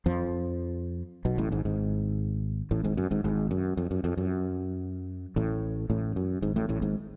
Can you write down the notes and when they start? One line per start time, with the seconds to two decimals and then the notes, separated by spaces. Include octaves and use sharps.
0.06 F2 F3
1.25 B1 B2
1.38 A1 A2
1.52 G#1 G#2
1.65 G#1 G#2
2.71 A1 A2
2.84 G#1 G#2
2.97 F#2
3.11 G#1 G#2
3.24 G#1 G#2
3.51 F#2
3.77 F2
3.91 F#2
4.04 F2
4.17 F#2
5.36 A1 A2
5.90 A1 A2
6.16 F#2
6.42 G#1 G#2
6.56 A1 A2
6.69 A1 A2
6.82 G#1 G#2